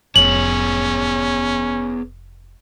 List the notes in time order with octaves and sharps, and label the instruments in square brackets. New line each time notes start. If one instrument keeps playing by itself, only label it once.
[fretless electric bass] F1 [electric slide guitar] B3 G#4 C#5 [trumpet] C#4 [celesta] F#7